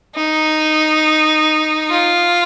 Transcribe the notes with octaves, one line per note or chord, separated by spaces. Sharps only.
D#4
F4